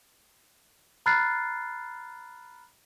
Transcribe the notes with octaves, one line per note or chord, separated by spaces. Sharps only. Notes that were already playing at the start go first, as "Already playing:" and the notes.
A#5 B5 F6 F#6 A6 C7